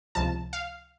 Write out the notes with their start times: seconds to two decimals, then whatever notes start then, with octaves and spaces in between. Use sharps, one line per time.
0.15 C#2 C3 F3 A5
0.53 F5